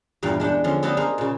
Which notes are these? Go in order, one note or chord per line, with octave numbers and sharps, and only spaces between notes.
E2 G2 A#2 F5 G5
G#3 D4 F#5 G5
D3 F3 C#4
B3 D4 G4 A4 B4 D#5
A#3 G#4 A#4 C5 D#5 F5
A#2 C#3